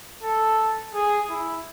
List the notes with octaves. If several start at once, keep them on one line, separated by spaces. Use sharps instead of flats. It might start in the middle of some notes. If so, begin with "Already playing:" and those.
A4
G#4
E4